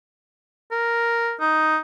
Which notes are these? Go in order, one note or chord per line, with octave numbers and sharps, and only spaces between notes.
A#4
D#4